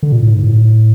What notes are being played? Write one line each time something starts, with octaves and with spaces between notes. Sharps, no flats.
D3
A#2
A2
G#2
A2